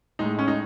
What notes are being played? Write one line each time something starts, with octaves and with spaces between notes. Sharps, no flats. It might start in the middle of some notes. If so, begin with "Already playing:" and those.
A2 G#3 D#4
C#4
D#4